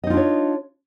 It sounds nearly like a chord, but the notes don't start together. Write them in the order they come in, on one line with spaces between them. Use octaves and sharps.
D#5 D#4 F4 D4 C#5